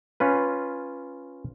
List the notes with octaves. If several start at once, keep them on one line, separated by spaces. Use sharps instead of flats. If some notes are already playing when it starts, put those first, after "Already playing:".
C#4 F4 B4